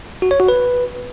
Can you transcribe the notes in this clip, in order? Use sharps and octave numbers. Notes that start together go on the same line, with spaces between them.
F#4
C#5
F#4
B4